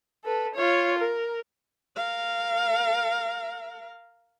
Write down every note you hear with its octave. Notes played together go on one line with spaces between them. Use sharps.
A4 B4
F4 C#5
A#4
A#4 F5